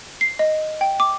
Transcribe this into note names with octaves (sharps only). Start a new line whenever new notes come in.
C7
D#5
G5
D6